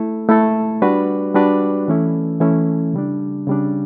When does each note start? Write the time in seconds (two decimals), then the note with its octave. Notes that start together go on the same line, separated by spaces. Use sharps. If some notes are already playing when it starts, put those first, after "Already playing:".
Already playing: A3 E4 A4
0.29 A3 E4 A4
0.82 G3 D4 F#4 B4 D5
1.34 G3 D4 F#4 B4 D5
1.88 E3 A3 C#4 E4 A4
2.40 E3 A3 C#4 E4 A4
2.94 C#3 G3 D4
3.47 C#3 G3 D4